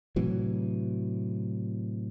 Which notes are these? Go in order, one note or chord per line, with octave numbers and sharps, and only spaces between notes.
A2 C3 E3 F#3